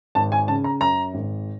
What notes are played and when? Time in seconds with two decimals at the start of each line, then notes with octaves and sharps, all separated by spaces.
0.15 G#1 A5
0.32 G#5
0.48 C#3 A5
0.64 A#5
0.81 F#2 A#5
1.14 G#1